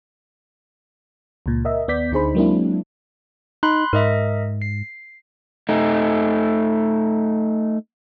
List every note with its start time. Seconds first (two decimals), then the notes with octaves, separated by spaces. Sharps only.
1.46 C#2 A#2
1.65 A#4 D#5 E5
1.88 D#2 B3 D5 G6 B6
2.11 D2 D3 D#4 G#4 C5 B5
2.35 F#3 G#3 A#3 C4 D4 E4
3.63 D#4 B5 C6 F#6
3.93 G#2 A#4 D#5 E5
4.62 C7
5.69 A3 D#4